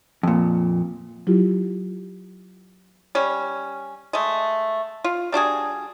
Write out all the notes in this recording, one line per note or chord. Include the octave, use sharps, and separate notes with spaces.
F2 A#2
F#3 E4 F4 G4
G3 C#4
G#3 A3
F4
G3 D4 F#4 G#4